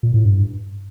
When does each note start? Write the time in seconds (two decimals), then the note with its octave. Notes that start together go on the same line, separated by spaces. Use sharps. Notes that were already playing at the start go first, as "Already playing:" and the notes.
0.03 A#2
0.14 A2
0.25 G2